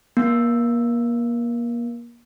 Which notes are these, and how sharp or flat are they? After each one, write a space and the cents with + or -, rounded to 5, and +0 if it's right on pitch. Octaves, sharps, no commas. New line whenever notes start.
A#3 +30